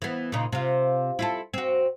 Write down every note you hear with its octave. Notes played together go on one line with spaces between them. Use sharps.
E3 B3
A#2 C#3 D#4
C3 F4
E4 F4 A4
C4 F#4